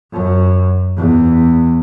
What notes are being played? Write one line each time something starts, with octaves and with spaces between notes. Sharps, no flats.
F#2
E2